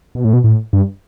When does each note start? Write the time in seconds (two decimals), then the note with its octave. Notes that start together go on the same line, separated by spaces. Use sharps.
0.15 B2
0.24 A2
0.33 B2
0.44 A2
0.73 G2